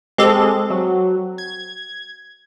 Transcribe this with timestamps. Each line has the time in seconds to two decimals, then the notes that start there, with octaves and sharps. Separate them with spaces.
0.18 G#3 C4 G4 A4
0.70 F#3
1.38 G#6